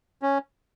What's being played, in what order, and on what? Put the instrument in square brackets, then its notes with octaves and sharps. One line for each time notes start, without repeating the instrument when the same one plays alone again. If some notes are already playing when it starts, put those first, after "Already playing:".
[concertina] C#4